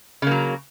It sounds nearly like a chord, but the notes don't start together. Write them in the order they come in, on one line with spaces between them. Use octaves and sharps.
C#3 A#3 F#3